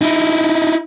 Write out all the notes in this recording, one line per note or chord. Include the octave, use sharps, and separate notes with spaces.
D#4 E4